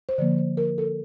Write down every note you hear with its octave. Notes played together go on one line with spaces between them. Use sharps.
C5
D3 F3 A#3 D5
C5
A#4
A4